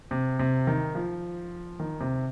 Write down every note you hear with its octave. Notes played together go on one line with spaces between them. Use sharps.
C3
C3
D#3
F3
D#3
C3